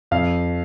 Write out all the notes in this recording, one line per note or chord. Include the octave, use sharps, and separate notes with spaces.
F2 F5